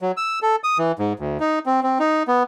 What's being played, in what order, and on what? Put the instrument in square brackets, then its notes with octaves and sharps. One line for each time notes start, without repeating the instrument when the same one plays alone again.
[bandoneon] F#3
E6
A4
D#6
E3
G#2
D2
D#4
C4
C4
D#4
B3